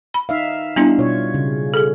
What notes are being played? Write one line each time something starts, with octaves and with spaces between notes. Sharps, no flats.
B5
D#4 E5 F5
G3 B3 D4 E4
B2 F4 C#5
C#3
G#4 A4